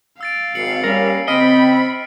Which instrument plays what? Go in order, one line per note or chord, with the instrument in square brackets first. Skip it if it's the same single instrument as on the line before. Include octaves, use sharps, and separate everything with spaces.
[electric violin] F5 [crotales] E6 A6 D7
[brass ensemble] G#1 [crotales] C7 C#7 F#7
[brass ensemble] G3 A#3 C#4 [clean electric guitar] A#4
[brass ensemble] C#3 C4 [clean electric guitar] D#5 [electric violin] B5 [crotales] F6 B6 D7